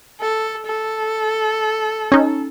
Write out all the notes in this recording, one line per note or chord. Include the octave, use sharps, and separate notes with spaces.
A4
A4
C#4 D#4